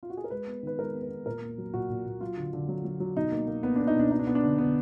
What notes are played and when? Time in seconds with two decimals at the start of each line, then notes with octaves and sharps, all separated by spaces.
0.03 F4
0.10 F#4
0.17 G#4
0.24 A#4
0.31 G#3 B4
0.47 B3
0.63 D#3 B4
0.79 G#3 A#4
0.94 B3
1.02 B4
1.10 B3
1.26 A#2 A#4
1.42 A#3
1.58 F#3
1.74 A#2 F#4
1.90 A#2
2.06 A#2
2.21 F#3 F4
2.37 D3
2.53 D3
2.69 F#3
2.84 F#3
3.00 F#3
3.16 B2 D#4
3.32 A#3
3.48 A#3
3.63 A#3 B3
3.76 D4
3.80 A#3
3.87 D#4
3.95 B2 D4
4.11 B3 D#4
4.19 D4
4.27 B3
4.35 D4
4.43 D3
4.58 D3 B3